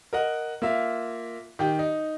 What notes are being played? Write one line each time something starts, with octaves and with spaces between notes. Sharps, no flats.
A#4 D#5 F#5
A#3 F4 E5 F5
D#3 G4 G5
D#4